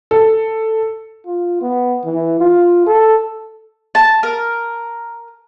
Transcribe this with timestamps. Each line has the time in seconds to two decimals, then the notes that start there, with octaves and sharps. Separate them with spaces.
0.11 A4
1.26 F4
1.62 B3
2.05 E3
2.40 F4
2.86 A4
3.95 A5
4.23 A#4